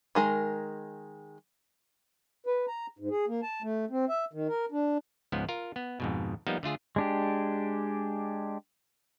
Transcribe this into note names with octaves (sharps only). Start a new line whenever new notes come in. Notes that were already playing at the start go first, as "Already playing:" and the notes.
D#3 G#3 A#4
B4
A#5
G#2
G#4
A#3
A5
A3
C4
E5
D#3
A#4
D4
C#2 G#2 F3 B3
F4 A#4
B3
F2 G#2 B2
F3 G3 A#3 B3 D#4
D3 A3 F4 G#4
G#3 D4 G4